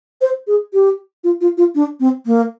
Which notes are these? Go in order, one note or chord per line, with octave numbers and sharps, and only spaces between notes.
C5
G#4
G4
F4
F4
F4
D4
C4
A#3